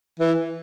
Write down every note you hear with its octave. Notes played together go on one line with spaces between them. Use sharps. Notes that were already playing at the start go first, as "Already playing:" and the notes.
E3